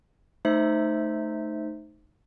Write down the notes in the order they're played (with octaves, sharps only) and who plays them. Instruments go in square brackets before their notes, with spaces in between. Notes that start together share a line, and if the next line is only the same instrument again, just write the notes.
[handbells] A3 D#4 C5 E5